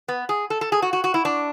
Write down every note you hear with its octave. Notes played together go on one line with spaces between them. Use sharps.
B3
G#4
A4
A4
G#4
F#4
F#4
F#4
E4
D4